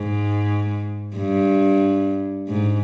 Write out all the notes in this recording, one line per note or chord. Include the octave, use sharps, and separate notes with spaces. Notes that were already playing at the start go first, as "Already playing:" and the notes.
Already playing: G#2
G2
G#2